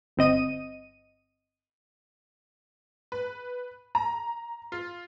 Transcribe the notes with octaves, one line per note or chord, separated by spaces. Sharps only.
G1 C4 D#5 D#7
B4
A#5
F4